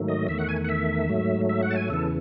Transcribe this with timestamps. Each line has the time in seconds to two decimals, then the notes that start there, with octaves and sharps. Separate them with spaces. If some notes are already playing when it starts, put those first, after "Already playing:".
Already playing: G#2 D#3 F#3 A3
0.09 D#5
0.28 E2 D#3 A3 E5
0.39 F#5
0.49 G#5
0.65 F#5
0.69 E5
1.09 G#2 F#3 A3
1.49 E5
1.63 F#5
1.71 A5
1.76 G#5
1.90 E2 C#3 E3 A4